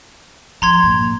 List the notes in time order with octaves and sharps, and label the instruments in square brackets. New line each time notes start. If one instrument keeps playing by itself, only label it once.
[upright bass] F3 [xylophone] A#5 C6 G#6
[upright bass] G2 A#2